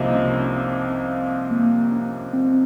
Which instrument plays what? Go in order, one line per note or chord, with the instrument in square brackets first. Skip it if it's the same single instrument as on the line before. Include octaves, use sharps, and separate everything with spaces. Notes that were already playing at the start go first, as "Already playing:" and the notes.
Already playing: [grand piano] C2 C3 F3 A#3 D#4
[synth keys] C#4
C#4
C4
A#3
C#4
C4